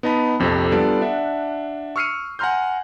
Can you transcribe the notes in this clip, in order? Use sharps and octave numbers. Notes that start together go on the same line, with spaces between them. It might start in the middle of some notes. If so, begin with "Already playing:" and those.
B3 D#4 D#5 A5 B5
A#1 F2 C3 G4 A4
G3 B3 D4 F4 A4 D5
D4 E5 F#5
C#6 E6 F6 C7 C#7 D#7
F#5 G#5 A#5 C6 F6 G6